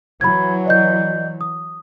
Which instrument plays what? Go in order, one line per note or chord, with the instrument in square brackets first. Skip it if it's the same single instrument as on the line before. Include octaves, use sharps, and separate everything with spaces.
[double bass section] E3 F#3 [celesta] B5 G#6
[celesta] D5 D#5 G6
D#6